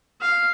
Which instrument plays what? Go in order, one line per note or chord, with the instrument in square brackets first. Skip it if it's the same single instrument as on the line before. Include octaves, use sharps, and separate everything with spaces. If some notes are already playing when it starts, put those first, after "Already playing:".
[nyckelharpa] F5